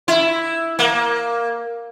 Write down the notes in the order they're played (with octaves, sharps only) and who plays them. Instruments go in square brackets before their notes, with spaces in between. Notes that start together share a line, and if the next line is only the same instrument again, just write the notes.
[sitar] E4
A#3